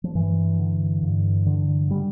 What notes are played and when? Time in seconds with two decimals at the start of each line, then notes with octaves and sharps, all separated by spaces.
0.04 F3
0.15 G2 E3
0.59 D3
1.03 G2
1.46 D3
1.90 D3 G3